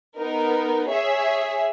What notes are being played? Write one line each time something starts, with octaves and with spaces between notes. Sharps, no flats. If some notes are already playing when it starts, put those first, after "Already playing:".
B3 D#4 A#4
G#4 C#5 E5